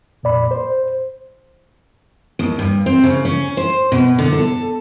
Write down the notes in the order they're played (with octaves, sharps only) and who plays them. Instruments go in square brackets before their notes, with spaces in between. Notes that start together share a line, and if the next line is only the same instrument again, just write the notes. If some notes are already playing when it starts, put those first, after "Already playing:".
[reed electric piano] F2 A#2 D5 B5
C5
[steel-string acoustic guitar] D#2
G2
C4
C#3
C#4
C5
B2
D3
A4